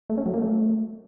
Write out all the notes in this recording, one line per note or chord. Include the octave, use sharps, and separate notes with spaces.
A3
C#4
F#3
A#3
A3